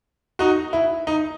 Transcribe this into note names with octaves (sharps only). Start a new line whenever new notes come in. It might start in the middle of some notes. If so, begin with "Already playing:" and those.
D#4 F#4
E4
D#4